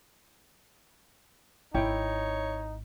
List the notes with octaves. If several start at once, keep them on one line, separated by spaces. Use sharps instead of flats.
G#1 D#4 E4 C#5 G5